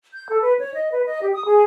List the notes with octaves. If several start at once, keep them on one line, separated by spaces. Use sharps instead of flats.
G6
A4
B4
C#5
D#5
B4
D#5
G4
D#6
G#4